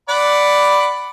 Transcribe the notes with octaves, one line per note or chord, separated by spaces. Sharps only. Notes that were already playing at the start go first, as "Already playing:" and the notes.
D5 F#5 B5